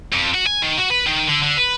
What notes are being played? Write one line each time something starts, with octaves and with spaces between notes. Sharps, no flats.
F2
F#4
G#5
D#3
F#4
B4
D#3
D3
D3
B4